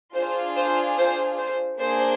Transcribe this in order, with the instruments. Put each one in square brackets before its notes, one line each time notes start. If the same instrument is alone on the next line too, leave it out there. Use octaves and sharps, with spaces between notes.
[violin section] D4 F4 G#4 C5
C5
C5
C5
A#3 D4 G#4 C5